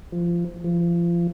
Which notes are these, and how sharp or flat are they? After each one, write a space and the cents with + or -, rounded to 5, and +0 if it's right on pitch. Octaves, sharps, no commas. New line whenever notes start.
F3 -20
F3 -30